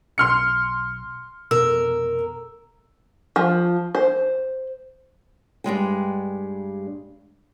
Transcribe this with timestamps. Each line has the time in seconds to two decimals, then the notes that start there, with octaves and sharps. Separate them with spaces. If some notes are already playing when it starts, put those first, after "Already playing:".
0.18 B1 C6 F6 C#7
1.51 F1 B2 A#4 E6
3.36 F3
3.95 C5
5.64 G2 G3 G#3 G5